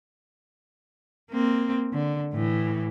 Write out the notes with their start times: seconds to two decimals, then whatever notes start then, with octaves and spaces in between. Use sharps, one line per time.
1.31 A#3 C4
1.93 D3
2.33 A2 E3